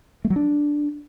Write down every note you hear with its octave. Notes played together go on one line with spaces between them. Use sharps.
A3
F#3
D4